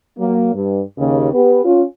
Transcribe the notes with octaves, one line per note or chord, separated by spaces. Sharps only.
F#3 A#3
G2
D#2 C#3
B3 G4 B4
C#4 F4